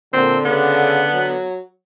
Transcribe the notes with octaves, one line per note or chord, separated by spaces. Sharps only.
A#2 D3 C4
C#3 B3
F#3